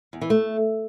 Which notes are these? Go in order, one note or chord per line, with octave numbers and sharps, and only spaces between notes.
E2
E3
A3